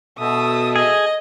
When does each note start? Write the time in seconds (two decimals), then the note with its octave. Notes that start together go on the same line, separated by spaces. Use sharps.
0.19 B2 A4 E5 D#6
0.76 G#4 D#5